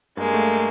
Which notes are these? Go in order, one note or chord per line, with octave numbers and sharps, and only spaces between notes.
G2 G#3 A#3
A3